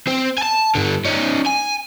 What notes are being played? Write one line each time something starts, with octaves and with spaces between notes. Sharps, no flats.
C4 C5
G#5 A5
G2 D3
C#4 D#4
G#5